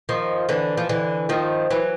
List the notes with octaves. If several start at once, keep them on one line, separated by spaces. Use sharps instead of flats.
D#3 F3
D3 E3
F3
D3 E3
D#3 F3
E3 F#3